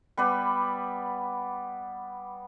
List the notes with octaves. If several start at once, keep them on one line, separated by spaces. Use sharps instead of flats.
G3 B3 B4 D5